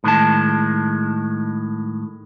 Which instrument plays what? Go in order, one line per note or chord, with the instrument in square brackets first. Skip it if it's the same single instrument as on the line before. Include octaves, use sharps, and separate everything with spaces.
[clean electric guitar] A2 D#3 G#3 A5